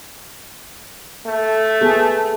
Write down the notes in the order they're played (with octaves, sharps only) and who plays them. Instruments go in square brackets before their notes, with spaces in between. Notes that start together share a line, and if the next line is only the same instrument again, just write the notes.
[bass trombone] A3
[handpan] B3 G#4 A4